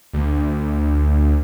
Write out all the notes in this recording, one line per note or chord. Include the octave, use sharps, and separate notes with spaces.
D2